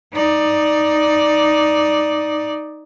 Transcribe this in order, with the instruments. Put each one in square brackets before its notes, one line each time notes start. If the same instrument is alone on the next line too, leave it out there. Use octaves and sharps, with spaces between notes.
[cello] D#4 D5